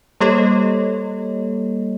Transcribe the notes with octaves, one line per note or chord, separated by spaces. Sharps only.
G3 A#3 G4 A4 C#5 D#5